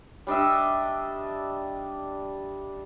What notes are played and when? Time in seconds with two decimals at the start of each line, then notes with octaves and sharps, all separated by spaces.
0.27 G3 D4 D#5 E5